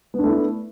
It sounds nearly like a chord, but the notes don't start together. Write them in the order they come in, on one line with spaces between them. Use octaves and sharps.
B3 D4 A3 E4